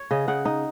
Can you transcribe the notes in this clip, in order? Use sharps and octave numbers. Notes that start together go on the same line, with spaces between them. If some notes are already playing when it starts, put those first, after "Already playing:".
Already playing: C#5
C#3 D#5
C#3 F#5
D#4